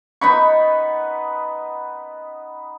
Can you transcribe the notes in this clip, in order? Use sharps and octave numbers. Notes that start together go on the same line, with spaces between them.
B3 D#4 B5 C#6